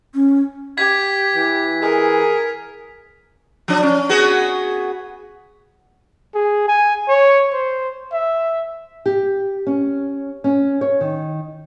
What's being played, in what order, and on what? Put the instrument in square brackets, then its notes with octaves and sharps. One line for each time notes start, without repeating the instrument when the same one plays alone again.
[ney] C#4
[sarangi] G4 [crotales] G#6 B6
[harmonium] E3
[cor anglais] G#4 [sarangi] A#4
[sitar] F3 D4
C#4
B3 F#4 G#4
[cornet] G#4
G#5
C#5
C5
E5
[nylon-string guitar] G4
C#4
C#4
C#5
D#3